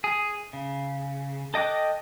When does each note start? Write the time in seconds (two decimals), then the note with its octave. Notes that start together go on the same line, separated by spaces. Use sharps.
0.04 G#4
0.53 C#3
1.54 A4 D#5 G5 D6 F#6